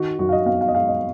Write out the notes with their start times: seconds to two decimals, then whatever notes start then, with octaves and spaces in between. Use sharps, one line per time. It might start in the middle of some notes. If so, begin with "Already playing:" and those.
Already playing: D#3 F#4
0.19 F#2 F#4
0.29 F5
0.33 D#5
0.46 B3 F5
0.61 F5
0.68 D#5
0.74 G#3 F5
0.88 D#5